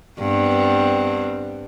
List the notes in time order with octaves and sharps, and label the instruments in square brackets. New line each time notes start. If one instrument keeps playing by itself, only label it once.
[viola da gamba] G2 B3 C4